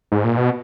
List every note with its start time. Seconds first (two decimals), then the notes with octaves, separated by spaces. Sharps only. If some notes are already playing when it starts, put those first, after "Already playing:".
0.12 G#2
0.24 A#2
0.37 B2